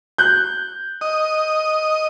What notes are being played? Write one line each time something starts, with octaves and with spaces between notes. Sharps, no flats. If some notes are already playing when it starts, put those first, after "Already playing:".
F#6 G6
D#5